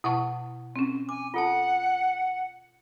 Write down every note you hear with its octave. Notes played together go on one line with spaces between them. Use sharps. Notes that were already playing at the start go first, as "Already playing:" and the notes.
B2 E4 F#5 A5 C#6
C4 C#4
G#5 D6
F4 A4 F#5 A5